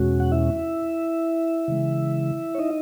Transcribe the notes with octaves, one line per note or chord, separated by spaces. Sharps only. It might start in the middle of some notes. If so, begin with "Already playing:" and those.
Already playing: E2 B2 G#3 C#4 F#4
F#5
E4 E5
C#3 E3 G#3
C#5
D#4 D#5